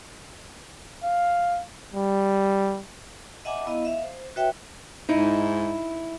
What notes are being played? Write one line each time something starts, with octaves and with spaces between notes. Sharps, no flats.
F5
G3
D#5 E5 F#5 G#5 A#5 D6
B3 E4 D#5 F5
E5 F5
C5
F#4 B4 C#5 E5 G5
G#2 D#4 E4